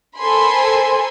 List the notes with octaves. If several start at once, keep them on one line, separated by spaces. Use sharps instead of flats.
A4 A#4 C5 G#5 B5 C6